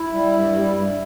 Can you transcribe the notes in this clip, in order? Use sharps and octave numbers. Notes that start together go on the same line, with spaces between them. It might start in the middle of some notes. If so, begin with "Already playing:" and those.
Already playing: E4
G3
G2
G3
G2